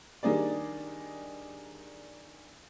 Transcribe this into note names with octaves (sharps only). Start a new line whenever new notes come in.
D#3 G3 D4 D#4 G#4 D5